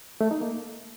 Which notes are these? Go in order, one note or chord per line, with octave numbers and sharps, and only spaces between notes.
A3
D#4
A#3